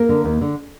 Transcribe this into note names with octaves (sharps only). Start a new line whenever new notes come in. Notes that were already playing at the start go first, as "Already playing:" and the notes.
Already playing: A#3 A#4
D3
D#2
D3